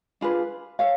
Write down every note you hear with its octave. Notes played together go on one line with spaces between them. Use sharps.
D4 F4 G#4 B4
A4 C#5 F5